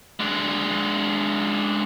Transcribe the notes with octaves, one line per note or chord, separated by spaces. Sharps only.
G#3 D4